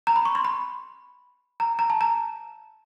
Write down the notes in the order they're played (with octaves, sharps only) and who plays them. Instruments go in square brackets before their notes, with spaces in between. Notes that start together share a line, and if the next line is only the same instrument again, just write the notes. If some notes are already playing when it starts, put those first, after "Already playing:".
[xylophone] A#5
B5
C#6
C6
B5
A#5
A#5
A5
A#5